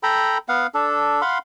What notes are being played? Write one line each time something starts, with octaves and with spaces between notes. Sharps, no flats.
A4 G5 A#5 B5
B3 F5 F#5
D4 A4
F5 F#5 B5 C6